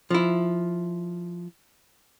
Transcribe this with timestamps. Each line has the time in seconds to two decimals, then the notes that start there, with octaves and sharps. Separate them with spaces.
0.10 F3 E4